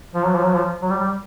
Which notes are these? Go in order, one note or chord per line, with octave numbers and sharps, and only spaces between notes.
F3
F#3
F3
F#3
F3
F#3
G3
G3